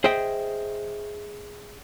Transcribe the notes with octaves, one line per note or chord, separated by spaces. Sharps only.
G#4 C5 D#5 E5 G5